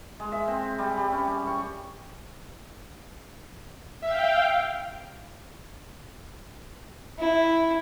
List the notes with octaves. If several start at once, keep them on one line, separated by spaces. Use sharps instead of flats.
G#3
E5
C4
G3
G3
C#4
G3
C#6
E5 F5 G5
E4